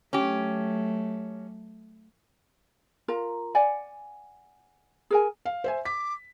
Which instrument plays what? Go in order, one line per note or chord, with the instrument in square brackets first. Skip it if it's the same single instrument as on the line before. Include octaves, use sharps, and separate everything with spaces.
[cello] F#3 A3 [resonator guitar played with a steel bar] C#4 G4
[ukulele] F4 A#4 A#5
D5 F#5 G#5
G#4 A#4 G#5
[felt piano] F5
C5 E5 G#5
[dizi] D6 [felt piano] B6